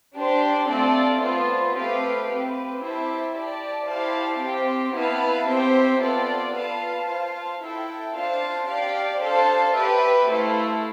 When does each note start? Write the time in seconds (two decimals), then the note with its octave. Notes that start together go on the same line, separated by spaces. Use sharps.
0.15 D4 G4 C5
0.69 A3 C4 F4 A4 D5
1.21 B3 F4 C5
1.75 A3 C4 G4 B4 F5
2.28 C4 G4 B4
2.82 E4 G4 C5 E5 A5
3.35 G4 D5 A5
3.88 E4 G4 C5 F5 A5
4.42 C4 G4 C5
4.95 B3 E4 B4 F5 A5
5.48 C4 G4 C5 E5
6.02 B3 F4 A4 D5
6.55 F4 B4 F5 A5
7.09 F4 C5 F5 A5
7.62 E4 A4 E5 G5
8.15 D4 F4 C5 F5 A5
8.69 G4 D5 F5
9.21 D4 A4 C5 F5 A5
9.76 G4 B4 E5
10.28 A3 E4 A4 C5 F5